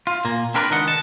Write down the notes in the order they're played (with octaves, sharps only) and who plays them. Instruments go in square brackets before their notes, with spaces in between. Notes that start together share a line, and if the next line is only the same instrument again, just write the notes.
[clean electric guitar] F4
A#2 A#3
C4 D4 A#4 B4 C#5 D5
C#2 D#3 D4 D#5 F#5
A5